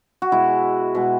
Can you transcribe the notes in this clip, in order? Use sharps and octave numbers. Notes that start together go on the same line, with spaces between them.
F#4
B2 G#3 E4
B2 G#3